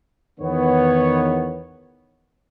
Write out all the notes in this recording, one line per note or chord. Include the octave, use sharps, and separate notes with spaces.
E2 D#3 B3 C#5